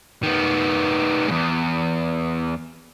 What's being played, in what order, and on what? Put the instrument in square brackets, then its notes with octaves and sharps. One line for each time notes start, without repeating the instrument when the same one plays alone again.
[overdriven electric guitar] D#3 B3
E2 G#2